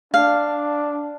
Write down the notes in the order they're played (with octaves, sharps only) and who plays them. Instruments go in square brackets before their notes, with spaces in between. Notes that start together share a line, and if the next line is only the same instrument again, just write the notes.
[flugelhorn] D4 [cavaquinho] F5